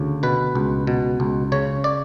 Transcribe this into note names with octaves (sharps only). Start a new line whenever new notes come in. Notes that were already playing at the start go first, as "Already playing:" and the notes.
Already playing: D2 C#3
B2 B4
C#2
B2
C#2
C#3 C#5
D5